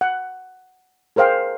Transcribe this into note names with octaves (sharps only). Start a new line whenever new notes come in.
F#5
G#4 A#4 C5 F5 G5